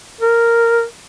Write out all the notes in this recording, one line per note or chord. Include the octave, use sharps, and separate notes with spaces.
A#4